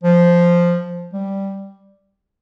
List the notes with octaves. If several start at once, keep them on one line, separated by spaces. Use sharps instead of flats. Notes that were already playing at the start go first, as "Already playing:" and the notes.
F3
G3